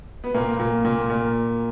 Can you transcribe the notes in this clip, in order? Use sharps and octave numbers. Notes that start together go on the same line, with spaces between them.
B3
A#2 A#3
A#2
A#2
A#2